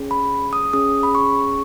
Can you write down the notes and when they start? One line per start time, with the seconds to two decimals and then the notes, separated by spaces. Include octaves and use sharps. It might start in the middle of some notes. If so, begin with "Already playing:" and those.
Already playing: C#4 G#4
0.11 B5
0.53 D#6
0.73 C#4 G#4 D#6
1.03 B5
1.15 C#6